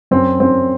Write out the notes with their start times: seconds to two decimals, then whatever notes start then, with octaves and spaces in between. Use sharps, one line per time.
0.11 F#2 C4
0.40 F#2 C4